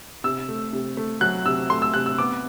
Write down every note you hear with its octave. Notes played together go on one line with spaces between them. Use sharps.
C3 E6
A3
C3
A3
F#3 F#6
C3 E6
A3 C6
E6
C3 F#6
E6
B3 D6